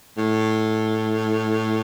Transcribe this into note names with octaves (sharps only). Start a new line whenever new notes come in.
A2